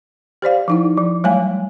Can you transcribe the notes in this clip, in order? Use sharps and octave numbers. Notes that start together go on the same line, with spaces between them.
G4 C5 D5 F5
F3 D#4 E4
F3
F#3 G3 A3 C#5 F5 G#5